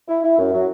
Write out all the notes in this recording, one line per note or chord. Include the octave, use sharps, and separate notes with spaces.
E4
E4
F#2
F#3